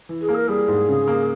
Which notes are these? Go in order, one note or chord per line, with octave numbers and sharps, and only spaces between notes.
E3
G#4
A#3
A#4
G3 G#4
G#2
C#3
A#3